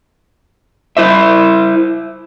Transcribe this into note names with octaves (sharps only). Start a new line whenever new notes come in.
E4 C5 E5